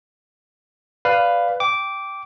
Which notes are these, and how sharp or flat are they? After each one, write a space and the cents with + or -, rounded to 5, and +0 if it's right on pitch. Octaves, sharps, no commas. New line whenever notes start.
B4 +10 D5 +0 F5 +0
G5 +0 D6 -10